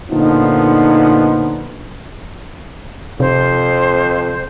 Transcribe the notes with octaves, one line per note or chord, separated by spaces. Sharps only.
A#2 D3 F3 B3 D#4
F2 C3 C5